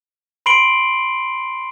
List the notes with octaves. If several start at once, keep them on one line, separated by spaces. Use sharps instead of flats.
B5 C6 C7 D7 F#7 G7